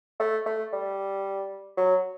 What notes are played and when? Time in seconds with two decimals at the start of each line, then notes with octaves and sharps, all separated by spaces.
0.20 A3
0.46 A3
0.73 G3
1.77 F#3